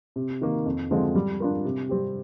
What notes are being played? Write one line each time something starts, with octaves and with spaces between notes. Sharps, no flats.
C3
D#3 A#3
F2
D3 F3 G#3 C4
G3
D4 F4 A#4
C3
G3 C4 G4